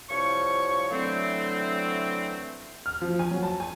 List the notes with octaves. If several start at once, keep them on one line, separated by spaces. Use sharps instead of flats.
C2 F3 C#5 C#6
D3 E3 F#3 A3 C4
F6
F3
G#5
F#3
A5
G#5